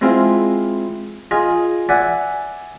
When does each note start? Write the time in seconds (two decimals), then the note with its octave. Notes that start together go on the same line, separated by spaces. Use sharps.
0.01 G#3 C4 E4 F4 C5
1.31 F4 G#4 D#5
1.89 D5 E5 F#5 G#5